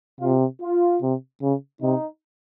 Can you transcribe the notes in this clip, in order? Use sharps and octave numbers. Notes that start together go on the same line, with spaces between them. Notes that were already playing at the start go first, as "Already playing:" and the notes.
C3 F4
F4
C3
C#3
C3 D#4